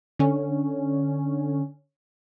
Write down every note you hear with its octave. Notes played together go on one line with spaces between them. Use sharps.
D3 C#4